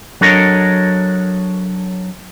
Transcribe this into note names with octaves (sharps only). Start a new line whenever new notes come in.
F#3 D4 A4 A#4 C#5 D#5